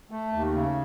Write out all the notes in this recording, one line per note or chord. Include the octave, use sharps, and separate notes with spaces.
A3
D#2
C#3